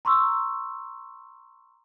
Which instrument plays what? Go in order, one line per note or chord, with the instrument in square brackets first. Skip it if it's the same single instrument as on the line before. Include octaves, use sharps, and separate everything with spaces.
[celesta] A#5 C6 C#6 E6